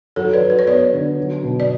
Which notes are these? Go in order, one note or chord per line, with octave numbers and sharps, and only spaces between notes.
F#3 A4 C#5
B4 D5
F#3
B4
C#5
B3 B4 D5
D3
F#3
B2
D5